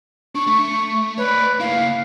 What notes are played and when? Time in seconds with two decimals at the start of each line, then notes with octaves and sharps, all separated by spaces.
0.35 D4 C#6
0.47 A3
1.18 B4 C#5 D5
1.60 A#3 E4 F5